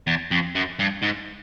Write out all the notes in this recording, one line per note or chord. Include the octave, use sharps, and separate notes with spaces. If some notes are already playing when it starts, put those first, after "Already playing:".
E2
F2
F#2
G2
G#2